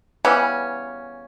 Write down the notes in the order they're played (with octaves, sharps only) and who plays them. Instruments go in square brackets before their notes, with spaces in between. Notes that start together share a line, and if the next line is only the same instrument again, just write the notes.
[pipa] C#3 E3 G3 B3 C#4